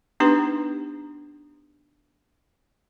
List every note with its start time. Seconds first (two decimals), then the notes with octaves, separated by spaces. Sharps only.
0.20 B3 D4 D#4 G4 B4 A#5